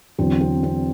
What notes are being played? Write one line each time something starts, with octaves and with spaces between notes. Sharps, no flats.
E2 D3 F#3 C4
C4
C4